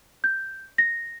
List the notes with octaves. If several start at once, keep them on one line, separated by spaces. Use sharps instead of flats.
G6
A#6